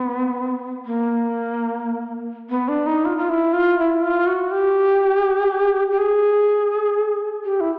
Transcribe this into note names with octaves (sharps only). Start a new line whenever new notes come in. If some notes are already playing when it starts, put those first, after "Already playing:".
Already playing: B3
A#3
B3
D4
D#4
F4
F4
E4
F4
E4
F4
F#4
G4
G4
G#4
G4
E4